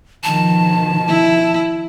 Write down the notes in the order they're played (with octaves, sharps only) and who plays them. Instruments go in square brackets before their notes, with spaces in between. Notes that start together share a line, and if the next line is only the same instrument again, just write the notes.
[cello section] B2 D#3 F3 [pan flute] A5
[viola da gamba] E4